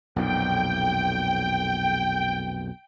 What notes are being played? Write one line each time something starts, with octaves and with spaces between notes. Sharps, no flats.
B1 F2 A#2 G5